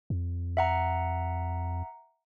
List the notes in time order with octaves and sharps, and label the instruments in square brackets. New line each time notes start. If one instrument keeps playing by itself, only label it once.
[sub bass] F2
[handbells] E5 F#5 A#5